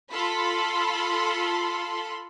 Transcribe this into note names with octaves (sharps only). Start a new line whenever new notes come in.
F4 A4 B5 C6